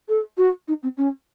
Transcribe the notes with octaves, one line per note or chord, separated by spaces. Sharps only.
A4
F#4
D#4
C4
C#4